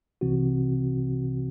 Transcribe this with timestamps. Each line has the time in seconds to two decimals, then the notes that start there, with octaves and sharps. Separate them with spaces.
0.21 C2 C3 E3 C4 F#4